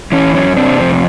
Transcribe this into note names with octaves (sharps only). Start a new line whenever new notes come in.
E3 C#4
F#2 C#4
C3 C4 D4
F2 C4